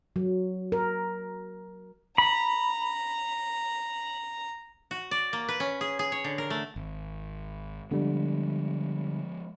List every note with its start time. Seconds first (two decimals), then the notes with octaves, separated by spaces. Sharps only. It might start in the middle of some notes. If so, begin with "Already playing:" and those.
0.16 F#3
0.72 A#4
2.18 A#5 B5
4.91 F#4
5.11 D5
5.33 A#3
5.48 B4
5.60 C#4
5.81 G#4
5.99 G#4
6.12 C#5
6.24 D3
6.38 A#4
6.50 A3
6.76 G#1
7.91 D3 F3 G3 G#3 B3